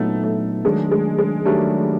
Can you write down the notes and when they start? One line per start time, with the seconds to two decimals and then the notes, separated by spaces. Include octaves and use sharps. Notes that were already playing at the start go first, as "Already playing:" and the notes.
Already playing: A#2 F#3 A3 B3 D#4
0.24 A3
0.65 D#3 F#3 G#3 A3 D4
0.91 G#3
1.19 G#3
1.45 D#3 F#3 G3 A3 D4